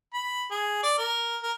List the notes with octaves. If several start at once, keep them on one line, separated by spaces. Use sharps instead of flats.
B5
G#4
D5
A#4
A#4